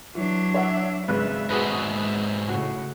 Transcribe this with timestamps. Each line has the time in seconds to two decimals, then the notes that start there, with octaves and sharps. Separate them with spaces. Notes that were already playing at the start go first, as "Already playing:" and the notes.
0.15 E3 F#3 D4
0.54 C#5 E5 F#5
1.08 G#1 C#3 B4 E5 F#6
1.50 G#2 B2 F#4 G#4 B4
2.48 A2 C#3 F#4